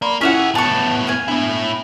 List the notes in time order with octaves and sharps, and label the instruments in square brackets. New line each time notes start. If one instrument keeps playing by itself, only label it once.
[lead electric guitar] A#3 [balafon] D5 B5 C6
[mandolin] C#4 E5 F#5 [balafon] E4 F4 [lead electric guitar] G4 G#4
[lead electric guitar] A2 B3 [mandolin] A5 C#6
[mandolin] F5 G#5
[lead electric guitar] A2 E4 [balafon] B3 D4 E5